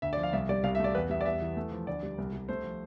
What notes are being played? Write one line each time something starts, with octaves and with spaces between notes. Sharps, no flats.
D2 E5
D5
F3
F5
C2 E5
G3 D5
C2 F5
E5
A3 D5
E2 B4
G3 E5
D5
E2 E5
E3
A3
F3
D2 D5
G3
C2
G3
A3 C5
F3